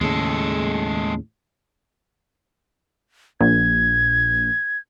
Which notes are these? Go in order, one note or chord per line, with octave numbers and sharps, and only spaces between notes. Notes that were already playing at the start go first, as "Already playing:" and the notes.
D#2 A2 C#3 G#3 A4
A#1 G#6